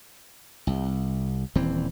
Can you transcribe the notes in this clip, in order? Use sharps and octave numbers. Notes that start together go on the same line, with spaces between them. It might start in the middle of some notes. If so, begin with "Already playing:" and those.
C2
D#1 E3 C4